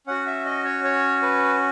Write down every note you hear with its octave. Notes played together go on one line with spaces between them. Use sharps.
C#4 F#4 F#5
E5
D#5
C#5
C#5
B4